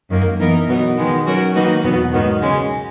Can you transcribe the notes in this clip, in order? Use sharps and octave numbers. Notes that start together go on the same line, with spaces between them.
F#2 D#3 A#3
E3 B3 D#4 A#4
B2 F#3 B3 D#4
D#3 G#3 B3
F#3 C#4 F#4 A#4
D#3 A#3 D#4 F#4 B4
E2 B2 F#3 B3
G#2 D#3 F#3 B3
C#3 G#3 C#4